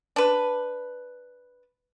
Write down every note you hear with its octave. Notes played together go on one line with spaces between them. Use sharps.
D4 B4